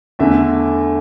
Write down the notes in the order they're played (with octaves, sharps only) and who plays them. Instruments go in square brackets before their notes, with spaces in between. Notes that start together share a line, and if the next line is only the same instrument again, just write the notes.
[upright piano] E2 D3 A3 E5